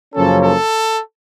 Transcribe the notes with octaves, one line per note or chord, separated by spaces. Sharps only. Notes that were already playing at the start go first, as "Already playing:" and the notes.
F#2 C#3 F3 A#3 C#4 A4
A4